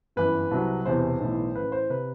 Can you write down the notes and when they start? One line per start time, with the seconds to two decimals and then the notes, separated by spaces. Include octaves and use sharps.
0.16 G1 F#2 E3 B4
0.51 C2 C3 F#3
0.86 E1 E2 C3 E3 C5
1.20 B1 A2 E3
1.55 A1 A2 E3 B4
1.72 C5
1.90 C3 B4